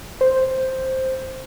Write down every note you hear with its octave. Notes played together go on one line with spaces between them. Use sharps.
C5